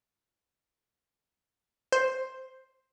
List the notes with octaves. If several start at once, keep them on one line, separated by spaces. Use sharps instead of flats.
C5